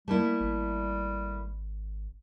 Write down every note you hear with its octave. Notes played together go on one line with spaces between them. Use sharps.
G3 A3 A#3 E4
G#1